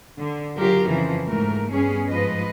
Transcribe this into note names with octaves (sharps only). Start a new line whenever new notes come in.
D3
C#3 F#3 F4 G4 A#4
F2 C#3 E3 F3
G#2 A3 A#4
G2 B3 C#4 G#4
G#2 F3 B4 D#5